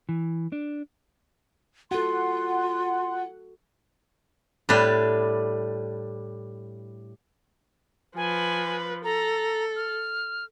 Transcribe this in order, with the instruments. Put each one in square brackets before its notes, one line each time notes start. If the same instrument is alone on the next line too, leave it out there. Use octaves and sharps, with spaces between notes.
[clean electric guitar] E3
D4
[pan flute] F4 [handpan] F#4 A4 [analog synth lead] F#5 [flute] C6
[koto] A2 G3 D4 B4
[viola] F3 B4 [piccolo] G#5
[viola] A4 [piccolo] A#5
[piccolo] F6